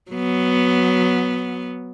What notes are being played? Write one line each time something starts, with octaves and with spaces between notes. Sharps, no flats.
F#3 B3